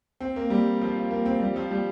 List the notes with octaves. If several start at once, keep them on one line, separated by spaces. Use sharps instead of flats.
C4
A#3
G3
F3
F3
A#3
C4
G3
F3
G3